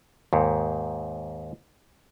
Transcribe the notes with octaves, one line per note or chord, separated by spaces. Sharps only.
D#2 G#2